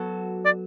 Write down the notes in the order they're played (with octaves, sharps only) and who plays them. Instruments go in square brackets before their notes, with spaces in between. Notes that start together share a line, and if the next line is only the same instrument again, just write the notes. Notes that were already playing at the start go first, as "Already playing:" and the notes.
Already playing: [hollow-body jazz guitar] F#3 B3 F#4 A4
[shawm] D5